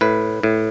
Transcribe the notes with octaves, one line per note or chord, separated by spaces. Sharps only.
A2 B4
A2